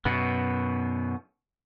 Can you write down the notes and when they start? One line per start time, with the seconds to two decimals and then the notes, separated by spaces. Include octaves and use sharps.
0.05 F#2 B2 B3